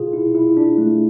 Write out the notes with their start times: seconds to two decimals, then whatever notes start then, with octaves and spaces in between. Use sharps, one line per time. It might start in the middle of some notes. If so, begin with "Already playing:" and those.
Already playing: B2 F4 G#4
0.13 E4
0.35 E4
0.57 D4
0.78 A3